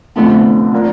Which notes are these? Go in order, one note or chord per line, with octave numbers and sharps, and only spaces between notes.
F1 F2 D3 F3 A3 B3
F3 A#3 D4